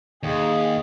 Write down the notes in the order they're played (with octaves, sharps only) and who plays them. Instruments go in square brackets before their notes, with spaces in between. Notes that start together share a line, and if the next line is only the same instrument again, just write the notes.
[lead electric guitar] D#2 [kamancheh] G#4